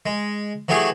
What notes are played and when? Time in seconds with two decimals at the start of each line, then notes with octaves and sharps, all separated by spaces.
0.06 G#3
0.69 E3 F#3 A3 G4 G#4